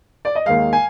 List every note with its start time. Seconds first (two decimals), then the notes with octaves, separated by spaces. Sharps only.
0.25 D5
0.35 D#5
0.46 D#2 D#3 G#3 F5
0.73 G#5